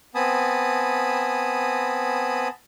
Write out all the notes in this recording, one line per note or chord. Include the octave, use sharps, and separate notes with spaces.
B3 C4 G#5 A5 B5 D#6